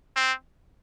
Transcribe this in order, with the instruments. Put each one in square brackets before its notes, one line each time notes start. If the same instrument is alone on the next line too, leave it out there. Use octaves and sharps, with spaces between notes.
[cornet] C4